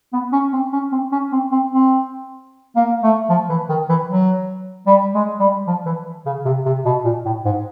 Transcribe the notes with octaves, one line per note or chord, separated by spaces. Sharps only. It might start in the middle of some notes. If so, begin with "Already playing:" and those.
B3
C#4
C4
C#4
C4
C#4
C4
C4
C4
A#3
A3
F3
E3
D#3
E3
F#3
G3
G#3
G3
F3
E3
C#3
C3
C3
B2
A#2
A2
G#2